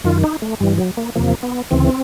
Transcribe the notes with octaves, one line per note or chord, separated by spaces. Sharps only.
F#2 D#3 F4
D#4
A3
G2 E3 G3
F#3
A#3
E2 C3 F3 A#3
B3
D2 C#3 E3 C4